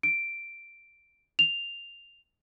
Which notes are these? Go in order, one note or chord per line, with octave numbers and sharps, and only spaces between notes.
D7
F7